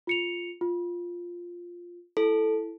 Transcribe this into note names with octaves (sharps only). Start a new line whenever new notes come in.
F4 C#7 F7
F4
E4 A4